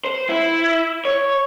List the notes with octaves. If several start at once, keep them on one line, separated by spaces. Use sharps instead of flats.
C5
E4
C#5